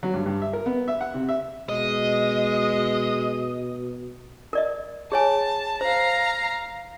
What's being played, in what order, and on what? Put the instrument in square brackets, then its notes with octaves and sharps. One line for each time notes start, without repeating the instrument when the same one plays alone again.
[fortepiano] F#3
G2
G2
E5
A#4
B3
E5
F#5
C3
E5
[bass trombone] B2 [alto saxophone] G#3 [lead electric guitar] D#5
[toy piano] A#4 D5 D#5
[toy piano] G#4 C#5 G#5 [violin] A5
[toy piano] C5 [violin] F5 A#5